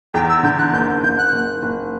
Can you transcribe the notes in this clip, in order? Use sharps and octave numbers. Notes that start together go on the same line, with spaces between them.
E2 G5
E6
D3 G6
F#6
F#1 G6
F#1 G6
F#6
F#1
F#1